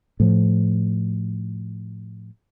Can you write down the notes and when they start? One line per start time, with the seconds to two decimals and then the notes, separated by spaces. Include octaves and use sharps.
0.20 A2 F3